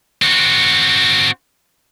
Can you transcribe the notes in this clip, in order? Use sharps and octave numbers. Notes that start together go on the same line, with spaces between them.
C4 F#4